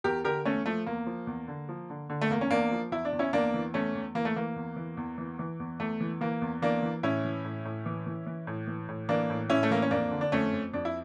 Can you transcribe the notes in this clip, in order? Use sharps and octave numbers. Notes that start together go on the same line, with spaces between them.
E2 G4 A#4
D3 G4 A#4
E2 A3 C#4
F3 A3
E2 A#3
F3
E2
D3
F3
D3
D3
A3
E2 A#3
C#4
E2 A#3 D4
F3
E2 E4
D4
E2
C#4 E4
E2 A#3 D4
E3
E2 A3 C#4
E2
E3 A#3
A3
E3 A#3
E2
E3
E2
E3
E3
E2
E2 A3
E3
E3 A#3
E2
E3 A#3 D4
E3
A2 C#4 E4
E3
A2
A2
E3
E3
E3
A2
E3
A2
E3 A#3 D4
A2
A2 C#4 E4
A3
E3 A#3
C#4
F2 A#3 D4
D3
D4
F2 A3 C#4
F2
F2 D4
E4